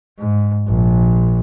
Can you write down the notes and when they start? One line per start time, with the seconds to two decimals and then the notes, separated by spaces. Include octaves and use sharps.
0.19 G#2
0.67 A#1